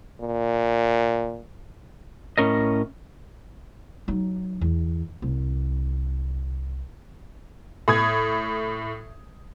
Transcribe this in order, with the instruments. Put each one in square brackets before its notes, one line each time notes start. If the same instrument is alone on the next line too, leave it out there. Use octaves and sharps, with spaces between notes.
[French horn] A#2
[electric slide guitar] A2 C#4 A#4 D#5
[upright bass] F#3 D#4
E2
C2
[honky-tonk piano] A2 D#6 G#6